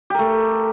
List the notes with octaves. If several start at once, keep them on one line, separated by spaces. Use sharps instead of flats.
A3 G4 A#4